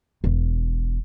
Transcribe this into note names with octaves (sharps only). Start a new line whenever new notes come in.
E1